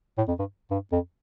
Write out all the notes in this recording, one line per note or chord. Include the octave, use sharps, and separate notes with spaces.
A2
F2
G2
G2
F2